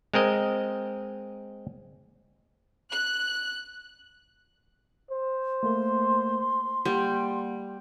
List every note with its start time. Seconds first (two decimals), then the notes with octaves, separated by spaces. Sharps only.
0.14 G#3 C4 A#4 D#5
2.91 F#6
5.11 C5
5.63 A3 A#3 A#4 C6
6.85 G3 A#3 F#5